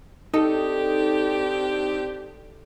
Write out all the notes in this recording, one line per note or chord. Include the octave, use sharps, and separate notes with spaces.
C4 D4 D#4 G4 A4